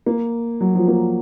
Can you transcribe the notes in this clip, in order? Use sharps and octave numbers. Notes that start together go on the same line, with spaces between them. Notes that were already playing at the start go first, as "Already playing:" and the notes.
A#3
F#3
F3
A#3